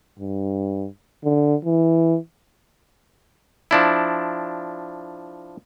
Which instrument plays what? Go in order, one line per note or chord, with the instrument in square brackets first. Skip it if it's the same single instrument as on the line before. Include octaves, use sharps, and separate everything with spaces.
[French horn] G2
D3
E3
[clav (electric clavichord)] F3 D4 E4